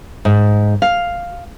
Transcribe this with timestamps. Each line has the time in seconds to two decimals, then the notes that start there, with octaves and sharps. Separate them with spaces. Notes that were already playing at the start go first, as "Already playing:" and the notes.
0.25 G#2
0.82 F5